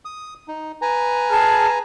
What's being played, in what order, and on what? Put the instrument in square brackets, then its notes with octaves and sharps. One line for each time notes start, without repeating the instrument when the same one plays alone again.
[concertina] D#6
D#4
B4 G#5 A#5
[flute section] G#4 A5 F6